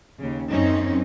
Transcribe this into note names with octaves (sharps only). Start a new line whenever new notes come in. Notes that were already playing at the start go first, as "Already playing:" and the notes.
D#2 C#3
F#2 C4 C#4 D#4